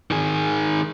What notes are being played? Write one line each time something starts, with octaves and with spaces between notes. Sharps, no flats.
D#3 G#4